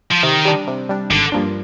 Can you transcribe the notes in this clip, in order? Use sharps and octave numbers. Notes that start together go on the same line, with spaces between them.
F3
C3 D#3
G3 D4
C3
G3 D4
G#1 D3
G2 F3 A#3 D4